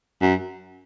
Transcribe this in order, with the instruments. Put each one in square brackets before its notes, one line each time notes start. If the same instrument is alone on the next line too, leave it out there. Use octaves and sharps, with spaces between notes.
[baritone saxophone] F#2